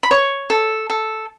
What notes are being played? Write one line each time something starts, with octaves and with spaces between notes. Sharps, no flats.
B5
C#5 C#6
A4
A4